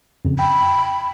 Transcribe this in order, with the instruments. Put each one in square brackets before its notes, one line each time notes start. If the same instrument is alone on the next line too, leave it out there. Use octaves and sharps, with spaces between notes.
[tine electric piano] F2 C#3
[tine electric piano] G5 [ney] B5